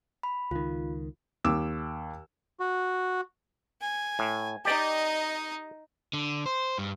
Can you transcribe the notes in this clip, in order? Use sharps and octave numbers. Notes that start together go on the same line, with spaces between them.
B5
C#2 D#3 F4
D#2 D6 E6
F#4
G#5
A2
D#4 G4 D5 D#5
D3
C5
G2